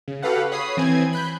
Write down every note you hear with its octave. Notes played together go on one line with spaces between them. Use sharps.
C#3
F#4 G4 A4 B4 F5 F#5
C#5 B5 D#6 C7
E3 C4 G#5 G#6
B5 F#6 G6